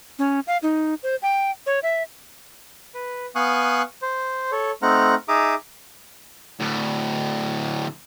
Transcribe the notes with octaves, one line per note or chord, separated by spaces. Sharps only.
C#4
F5
D#4
C5
G5
C#5
E5
B4
B3 F5 G#5 C#6 D#6 F#6
C5
A4 C#5
A3 C4 D#4 F#5 A#5 F6
D#4 G#4 E5 A#5 D6 D#6
D2 A2